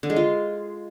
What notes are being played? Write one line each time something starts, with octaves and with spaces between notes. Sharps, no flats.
D3
G#3
F4